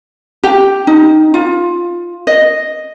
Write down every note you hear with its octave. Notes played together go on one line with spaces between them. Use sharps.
G4
D#4
F4
D#5